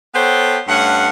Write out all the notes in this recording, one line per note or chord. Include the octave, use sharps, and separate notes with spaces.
B3 A4 C5 C#5 G5
G2 A3 C#4 F#5